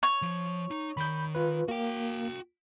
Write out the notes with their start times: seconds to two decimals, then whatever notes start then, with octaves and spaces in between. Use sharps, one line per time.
0.03 C#5
0.22 F3
0.71 D#4
0.97 D#3 B5 G6
1.35 F4 B4
1.68 A#3 F#4 G5